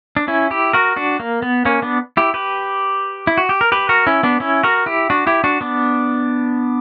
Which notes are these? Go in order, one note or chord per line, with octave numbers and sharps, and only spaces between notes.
D4
C#4 E4
E4 G4
F#4 A#4
D4 F#4
A#3
B3
A#3 C#4
B3 D4
E4 G4
G4 B4
E4
F#4
G4
A#4
G4 B4
F#4 A#4
C#4 E4
B3 D4
C#4 E4
F#4 A#4
E4 G4
D4 F#4
E4 G4
D4 F#4
B3 D4